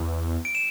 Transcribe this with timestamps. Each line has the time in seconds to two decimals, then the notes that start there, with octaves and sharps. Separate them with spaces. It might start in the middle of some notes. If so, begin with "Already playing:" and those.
Already playing: E2
0.45 D7
0.55 E7